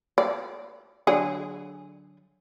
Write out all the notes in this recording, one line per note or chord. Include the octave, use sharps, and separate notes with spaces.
D5
D3 F#3 G#4